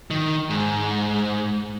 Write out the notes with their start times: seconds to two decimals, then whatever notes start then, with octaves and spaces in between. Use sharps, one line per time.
0.11 D#3
0.50 G#2